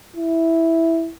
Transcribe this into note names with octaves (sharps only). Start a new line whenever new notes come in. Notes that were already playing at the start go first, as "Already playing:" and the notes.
E4